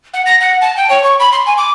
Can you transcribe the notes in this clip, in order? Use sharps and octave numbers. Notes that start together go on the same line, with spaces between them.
F#5
A#6
F#5
A5
G5
C#5
C#6
B5
C6
G#5
D6